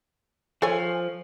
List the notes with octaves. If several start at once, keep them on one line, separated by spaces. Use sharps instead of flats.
F3 A4 C#5 G#5